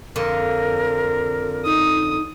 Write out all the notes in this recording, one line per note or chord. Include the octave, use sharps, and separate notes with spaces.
F2 D3 A#4
D#4 D#6